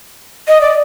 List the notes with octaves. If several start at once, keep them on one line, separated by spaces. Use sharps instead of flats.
D#5
D5